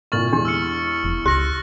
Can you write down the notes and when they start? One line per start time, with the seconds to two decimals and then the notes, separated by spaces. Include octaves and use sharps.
0.12 C2 A#2 C#6 F6 A6 F#7
0.33 E2 G#3 D4 G4
0.45 E6 F6 C#7
1.04 F1
1.26 C#2 G4 F#6 A#6 F#7